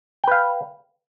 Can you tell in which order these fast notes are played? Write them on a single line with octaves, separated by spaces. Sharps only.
G5 B4 F5